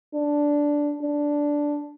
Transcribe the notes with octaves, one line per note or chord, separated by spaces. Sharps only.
D4
D4